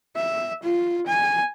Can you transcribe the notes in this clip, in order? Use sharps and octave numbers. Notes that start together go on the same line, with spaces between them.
E5
F4
G#5